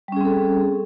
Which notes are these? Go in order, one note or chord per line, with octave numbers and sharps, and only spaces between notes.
G3 C4 C#4 G#4 A4